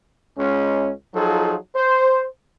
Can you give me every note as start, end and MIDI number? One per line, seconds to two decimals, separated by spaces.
0.38 0.92 37
0.38 0.92 56
0.38 0.92 61
1.14 1.56 53
1.14 1.56 54
1.14 1.56 63
1.14 1.56 65
1.14 1.56 68
1.14 1.56 69
1.75 2.26 72